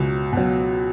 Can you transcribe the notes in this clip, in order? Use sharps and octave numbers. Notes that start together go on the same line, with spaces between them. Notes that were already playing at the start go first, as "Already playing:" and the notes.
Already playing: C#2 B2 F#3
B2 F#3